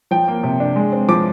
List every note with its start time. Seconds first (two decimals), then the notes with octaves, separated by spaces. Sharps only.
0.11 F3 G5
0.28 A#3
0.43 C3
0.60 D4
0.76 G#3
0.93 C4
1.08 F3 D6